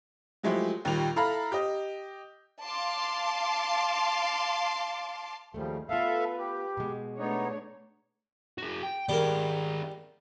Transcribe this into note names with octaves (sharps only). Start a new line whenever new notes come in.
F3 F#3 G#3 A3 E4 G4
D#2 A#2 G3 F7
E4 A4 F5 A#5 B5
G4 D#5
F5 A5 C6 D6
D#2 C#3 F3 G3 A3
B3 F4 A4 B4 E5 F5
G4
B2 G#3
A3 B3 D4 D#4 C#5
F#4 G#4
G5
D#3 G3 G#4 A#4